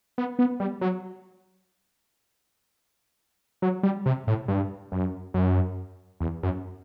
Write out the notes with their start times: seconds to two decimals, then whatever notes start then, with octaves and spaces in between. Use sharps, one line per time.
0.18 B3
0.39 B3
0.60 G3
0.81 F#3
3.62 F#3
3.83 G3
4.06 C3
4.27 A2
4.48 G2
4.92 F#2
5.34 F#2
6.20 E2
6.43 F#2